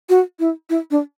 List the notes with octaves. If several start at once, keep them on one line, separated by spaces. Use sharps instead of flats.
F#4
E4
E4
D4